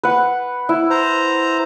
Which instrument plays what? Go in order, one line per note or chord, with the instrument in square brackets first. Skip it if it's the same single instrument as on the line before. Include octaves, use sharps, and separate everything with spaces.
[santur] B4 F#5
E4
[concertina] C5 A#5